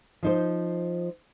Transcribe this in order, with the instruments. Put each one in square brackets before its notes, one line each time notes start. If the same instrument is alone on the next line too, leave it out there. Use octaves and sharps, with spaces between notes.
[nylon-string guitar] F3 D#4 C5